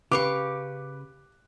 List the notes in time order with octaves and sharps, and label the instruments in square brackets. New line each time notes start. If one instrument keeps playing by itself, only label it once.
[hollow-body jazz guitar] C#3 [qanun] G4 F5 C#6 [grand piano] B4 [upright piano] D6